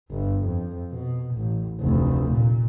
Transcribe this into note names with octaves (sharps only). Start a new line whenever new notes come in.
G1
F2
B2
A1
F1 D2
A#2